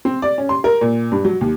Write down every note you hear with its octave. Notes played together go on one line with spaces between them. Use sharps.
C4
D5
C#4
C6
A#4
A#2
G2
F#3
D#2